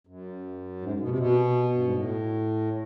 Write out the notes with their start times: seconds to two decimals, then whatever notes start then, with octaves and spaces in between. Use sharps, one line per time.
0.07 F#2
0.82 G#2
1.00 B2
1.08 C3
1.18 B2
1.75 G2
1.84 G#2
1.92 A2